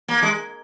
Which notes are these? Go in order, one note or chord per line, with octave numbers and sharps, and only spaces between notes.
A#3
G#3